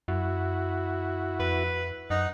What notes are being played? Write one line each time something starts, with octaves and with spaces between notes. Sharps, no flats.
F#2 E4 F#4
F2 B4
F#2 D#4 F#5